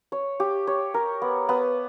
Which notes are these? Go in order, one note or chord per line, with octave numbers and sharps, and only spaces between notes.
C#5
G4
C#5
A#4
B3
B3